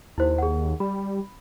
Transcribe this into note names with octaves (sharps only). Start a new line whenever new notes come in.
D#2 E4 C5
G#4 F#5
G3 B5